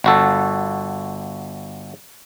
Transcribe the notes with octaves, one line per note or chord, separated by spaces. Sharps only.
G1 F#4 A4